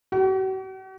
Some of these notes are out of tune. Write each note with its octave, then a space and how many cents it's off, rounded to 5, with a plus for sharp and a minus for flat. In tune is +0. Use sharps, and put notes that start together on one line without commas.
F#4 +45